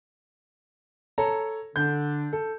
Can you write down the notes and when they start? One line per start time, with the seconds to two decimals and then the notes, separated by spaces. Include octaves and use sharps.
1.18 A4 C#5 A#5
1.76 D3 D4 G6
2.33 A4